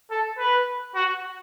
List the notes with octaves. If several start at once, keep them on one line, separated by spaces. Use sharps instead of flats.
A4
B4
F#4